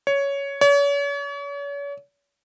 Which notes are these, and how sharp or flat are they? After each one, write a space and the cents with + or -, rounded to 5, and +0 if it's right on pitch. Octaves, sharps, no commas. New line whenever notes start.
C#5 +10
C#5 +40